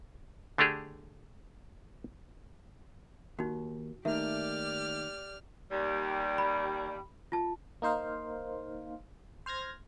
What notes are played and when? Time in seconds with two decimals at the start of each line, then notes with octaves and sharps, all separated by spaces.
0.58 D3 A3 D4 G4 G#4
3.39 D#2 D#4 F#4
4.05 D#3 A3 A#3 D#4 G4 D5 E5 F6
5.70 D#2 G3
6.38 B5
7.32 F4 A5
7.82 A#3 D#4 C5 F5
9.46 C5 F6 G#6 A#6